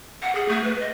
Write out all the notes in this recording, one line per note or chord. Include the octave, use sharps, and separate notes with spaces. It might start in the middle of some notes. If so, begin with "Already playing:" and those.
F#5
G#4
A3
B4
D#5